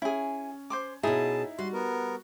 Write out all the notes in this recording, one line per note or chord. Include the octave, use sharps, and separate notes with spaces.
C#4 E4 G#4
C5 C6 D6
B2 C#4 D#4 E4 G#4 A5 D#6
G3 F#4 C6
B3 A#4